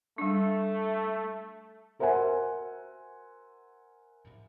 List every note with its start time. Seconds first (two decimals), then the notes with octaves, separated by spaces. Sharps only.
0.18 G3 A3 D4
1.99 F#4 A#4 C5 E5 F#5 G#5